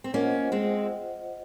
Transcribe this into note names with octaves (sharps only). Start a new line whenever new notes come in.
C4
A#3 C#4 F4 C5 D#5 F#5
G#3 C4